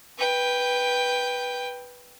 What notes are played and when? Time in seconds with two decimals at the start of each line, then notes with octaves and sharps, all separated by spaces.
0.18 B4 G5